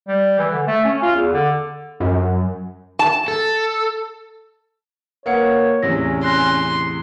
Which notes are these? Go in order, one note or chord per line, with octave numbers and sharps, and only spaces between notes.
G3
E3
D3
A3
C#4
F4
E2
D3
F#2
A5
A4
A#3 A#4 B4 C#5 F#5 C#7
E2 A2 C3 C#4 A#6
C6 F#6 A#6